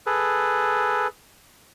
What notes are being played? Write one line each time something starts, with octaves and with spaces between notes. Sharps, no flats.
G#4 A4 B4